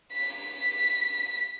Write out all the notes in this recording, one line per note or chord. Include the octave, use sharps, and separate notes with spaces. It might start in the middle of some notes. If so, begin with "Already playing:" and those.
B6